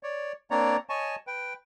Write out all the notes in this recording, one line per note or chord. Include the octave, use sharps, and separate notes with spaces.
C#5 D5
A#3 C4 D4 C#5 D5 A#5
C#5 D#5 G#5 A5 C#6
B4 G5